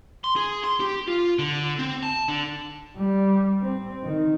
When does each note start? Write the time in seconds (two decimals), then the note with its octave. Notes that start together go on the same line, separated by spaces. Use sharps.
0.24 C6
0.36 G#4
0.64 C6
0.80 G4
1.07 F4
1.39 D3
1.79 C4
2.03 A5
2.28 D3
2.98 G3
3.62 C4
4.04 D#3